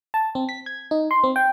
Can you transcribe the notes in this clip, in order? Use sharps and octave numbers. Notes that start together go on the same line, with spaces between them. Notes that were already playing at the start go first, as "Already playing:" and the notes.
A5
C4
B6
G#6
D#4
C6
C4
G5